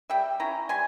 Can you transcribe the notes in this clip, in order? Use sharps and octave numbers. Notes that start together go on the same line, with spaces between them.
G3 E5 G5
C#4 E4 A#5
G3 G#5 C6